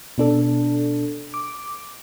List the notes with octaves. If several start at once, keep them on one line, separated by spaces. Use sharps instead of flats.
B2 D4 A4
D6